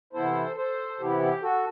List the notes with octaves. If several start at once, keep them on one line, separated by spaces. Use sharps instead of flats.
C3 E3 B3 E4 A4 C5
A4 C5
C3 E3 B3 E4 G4
G4
F#4 A4